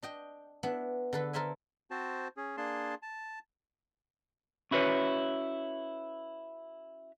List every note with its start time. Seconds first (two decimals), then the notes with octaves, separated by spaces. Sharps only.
0.03 D4 D#5 G5
0.63 B3 D4 E4
1.13 D3 A4 B4
1.33 A4 A#4 C5 E5 G#5
1.91 C4 F#4 C5 A5
2.37 C#4 G#4
2.57 A#3 D4 G#4 A5 C6
3.03 A5
4.71 C#4 E4 F#4 B4 C#5